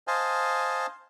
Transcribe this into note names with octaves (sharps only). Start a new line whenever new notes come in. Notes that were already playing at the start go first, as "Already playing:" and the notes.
C5 D#5 F5 G#5 A5